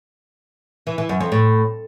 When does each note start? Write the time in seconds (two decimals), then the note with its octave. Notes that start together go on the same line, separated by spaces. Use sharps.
0.87 E3
0.98 E3
1.09 F#2
1.21 F2
1.32 A2